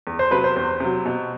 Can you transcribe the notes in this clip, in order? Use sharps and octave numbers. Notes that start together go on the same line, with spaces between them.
E2
C5
C3 F#3 B4
C5
E2 C5
C3 F#3
B2